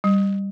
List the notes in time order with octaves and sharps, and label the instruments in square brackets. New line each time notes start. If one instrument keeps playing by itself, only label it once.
[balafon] G3